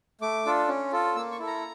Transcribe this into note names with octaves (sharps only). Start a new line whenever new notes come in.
A3 D6
D4 F4 A4
C#4
F4 A4
A#3 E6
C#6
E4 A4
A#5